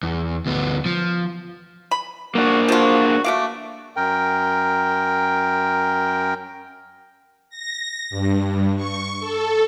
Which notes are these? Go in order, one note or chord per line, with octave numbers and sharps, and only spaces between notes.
E2
D2 B3
F3
B5
A#3 D4 F#4
F3 F4 F#4
A3 F#4 F5 D6
F#2 A#4 G5
A#6
G2
C#6
A4